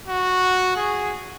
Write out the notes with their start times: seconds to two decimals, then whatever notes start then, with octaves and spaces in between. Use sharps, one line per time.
0.08 F#4
0.76 G#4